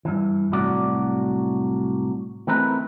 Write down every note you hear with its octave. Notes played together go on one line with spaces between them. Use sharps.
G2 E3
C2 A2 F#3 F#4 D5
E3 A3 C4 D#4 A#4 B4